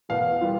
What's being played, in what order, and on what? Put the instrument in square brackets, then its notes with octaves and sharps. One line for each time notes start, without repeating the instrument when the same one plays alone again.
[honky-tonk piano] E2 B2 B3 [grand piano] F5
[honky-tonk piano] E3 G3 B3 F4